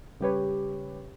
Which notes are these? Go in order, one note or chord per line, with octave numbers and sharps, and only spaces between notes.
C#3 G3 G4 B4 C#5